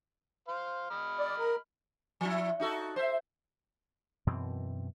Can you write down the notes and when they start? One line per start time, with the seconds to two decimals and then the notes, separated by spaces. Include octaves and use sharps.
0.48 C5 F5
0.90 D#5 B5 F6
1.19 D5
1.39 A#4
2.21 F3 E4
2.60 D#4 F#4 A4
2.96 C5 E5
4.27 F#2 B2 E3 C4